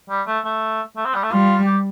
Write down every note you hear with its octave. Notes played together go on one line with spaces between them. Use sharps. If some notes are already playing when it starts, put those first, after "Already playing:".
G3
A3
A3
A3
C4
G3
A3
G3 F4
G4